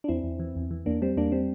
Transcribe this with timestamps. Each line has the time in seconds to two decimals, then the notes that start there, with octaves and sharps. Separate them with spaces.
0.04 D4
0.08 E2 C4 E4
0.24 E2
0.40 E3
0.56 E2
0.71 E3
0.86 E2 A#3 D4
1.02 G3 C4
1.17 E2 A#3 D4
1.32 G3 C4